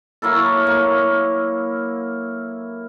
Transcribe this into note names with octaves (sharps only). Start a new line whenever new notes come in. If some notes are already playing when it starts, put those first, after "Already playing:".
F#3 A#3 E4 A4
A#3